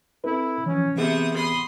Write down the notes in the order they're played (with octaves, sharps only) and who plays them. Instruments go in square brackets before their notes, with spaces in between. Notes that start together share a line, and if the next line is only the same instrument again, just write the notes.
[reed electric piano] C4 A4 B4 [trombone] E4
[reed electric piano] E3 F3 [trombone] C#4
[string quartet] C3 E5 D#6 [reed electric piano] E3 G#4 [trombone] B3
[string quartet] B5 C6 D#6